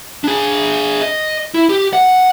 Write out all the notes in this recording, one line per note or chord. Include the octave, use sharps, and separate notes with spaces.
D4 G#4
D#5
E4
G4
F#5